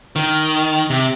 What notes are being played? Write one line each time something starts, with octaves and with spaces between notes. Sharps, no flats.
D#3
C3